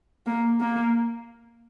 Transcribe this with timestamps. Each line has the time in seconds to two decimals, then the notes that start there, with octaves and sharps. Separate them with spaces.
0.27 A#3
0.60 A#3